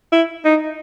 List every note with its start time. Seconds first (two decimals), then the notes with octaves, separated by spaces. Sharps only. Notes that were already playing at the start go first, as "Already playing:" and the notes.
0.12 E4
0.45 D#4